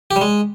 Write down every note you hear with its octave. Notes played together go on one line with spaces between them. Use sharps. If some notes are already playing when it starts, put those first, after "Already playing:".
G4
G3
G#3